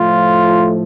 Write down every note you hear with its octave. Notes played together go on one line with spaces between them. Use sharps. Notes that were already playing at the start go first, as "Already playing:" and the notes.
Already playing: A2 F3 A3 F4